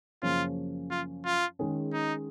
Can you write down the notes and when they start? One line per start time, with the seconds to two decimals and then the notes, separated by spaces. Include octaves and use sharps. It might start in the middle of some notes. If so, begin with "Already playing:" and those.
0.23 F#2 C#3 F3 A#3 C#4 F4
0.91 F4
1.25 F4
1.59 D#3 G#3 C#4 G#4
1.93 D#4